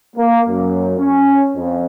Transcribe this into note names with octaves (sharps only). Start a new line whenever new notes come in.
A#3
F#2
C#4
F2